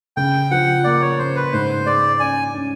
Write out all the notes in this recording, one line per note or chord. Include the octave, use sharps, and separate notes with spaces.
C#3 G5
F3 F#5
A#3 D5
C#5
C#3 C5
B4
G#2 C5
G#3 D5
C#4 G#5
C#4